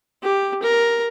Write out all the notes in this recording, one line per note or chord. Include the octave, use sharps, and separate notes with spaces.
G4
A#4